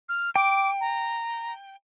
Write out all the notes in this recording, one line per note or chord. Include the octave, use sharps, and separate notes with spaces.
F6
G5 D6
A#5